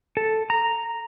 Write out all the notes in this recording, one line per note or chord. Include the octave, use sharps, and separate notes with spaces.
A4
A#5